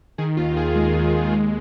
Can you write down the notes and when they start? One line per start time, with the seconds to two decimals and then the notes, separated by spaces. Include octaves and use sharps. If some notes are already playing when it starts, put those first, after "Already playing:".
0.18 D#3 G#4
0.37 D#2 F4
0.56 D#2 G#4
0.75 G#3
0.95 D#2
1.14 D#2
1.32 G#3